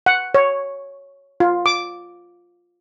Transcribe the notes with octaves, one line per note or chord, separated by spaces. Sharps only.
F#5
C#5
F4
D6